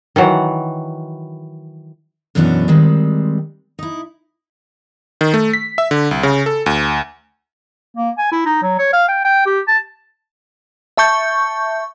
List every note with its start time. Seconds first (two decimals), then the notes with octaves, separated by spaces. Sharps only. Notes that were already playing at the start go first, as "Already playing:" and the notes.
0.16 D#3 E3 F#3 F#5
2.35 F#2 B2 E3 F#3 C#4 D4
2.68 D#3 G3 G#3 C4
3.79 D#4 E4
5.21 D#3
5.34 A3
5.53 B6
5.78 E5
5.91 D3
6.11 C2
6.23 C#3
6.46 A4
6.66 D2
7.97 A#3
8.18 G#5
8.32 E4
8.46 D#4
8.62 F#3
8.79 C#5
8.93 F5
9.08 G5
9.25 G5
9.46 G4
9.68 A5
10.97 E5 A5 C#6 G6